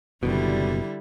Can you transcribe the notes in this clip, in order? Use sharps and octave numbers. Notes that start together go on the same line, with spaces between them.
F#1 B2 D3 G3 E4